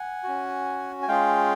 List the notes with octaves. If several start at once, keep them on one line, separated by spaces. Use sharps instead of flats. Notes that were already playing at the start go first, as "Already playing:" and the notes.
Already playing: F#5 G#5
C#4 F#4
G#5
G#3 C#4 F4 G#4 F5 G5